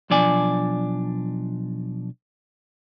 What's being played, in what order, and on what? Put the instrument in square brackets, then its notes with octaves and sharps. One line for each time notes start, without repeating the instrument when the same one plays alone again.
[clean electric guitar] B1 F3 D4 D5 G#5